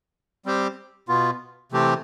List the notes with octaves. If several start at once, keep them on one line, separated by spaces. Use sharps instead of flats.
G3 C4 G4 C5
B2 B3 F4
C3 E3 A3 C4 G4